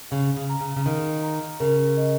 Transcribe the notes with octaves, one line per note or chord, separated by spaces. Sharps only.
C#3 F5
C#3
A#5
C#3
C#3
D#3 F5
A#5
C#3 A#4
D#5